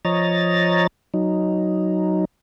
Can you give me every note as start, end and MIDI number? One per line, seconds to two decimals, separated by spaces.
0.05 0.87 53
0.05 0.87 73
0.05 0.87 75
0.05 0.87 82
0.05 0.87 93
1.14 2.25 54
1.14 2.25 63